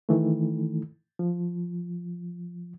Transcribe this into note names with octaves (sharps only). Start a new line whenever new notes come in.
D#3 E3 A3
F3